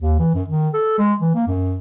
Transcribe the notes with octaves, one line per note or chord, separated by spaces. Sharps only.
D#2
E3
F#2
D#3
A4
G#3
E3
A#3
F#2